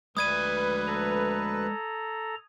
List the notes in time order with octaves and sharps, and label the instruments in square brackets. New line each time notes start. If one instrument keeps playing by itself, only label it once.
[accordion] D2 B4 [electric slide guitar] G#3 D5 [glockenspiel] D#6 G#6 D#7
[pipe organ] A4 A#5